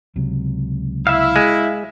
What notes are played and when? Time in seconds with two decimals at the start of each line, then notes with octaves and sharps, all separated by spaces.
0.16 C#2 C3 F#3
1.07 E4 E5 F5
1.36 G#3